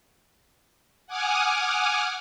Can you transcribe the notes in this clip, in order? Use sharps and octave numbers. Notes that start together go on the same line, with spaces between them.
F#5 G#5 D6 D#6 F6